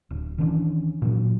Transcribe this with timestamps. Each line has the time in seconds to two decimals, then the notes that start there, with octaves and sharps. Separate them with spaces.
0.10 D1
0.38 D#3 E3 C#4 D4
1.02 A#2 F#3